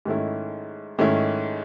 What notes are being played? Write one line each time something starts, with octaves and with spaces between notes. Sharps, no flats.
G#2 D#3 A3 C#4 E4
G#2 D#3 A3 C#4 E4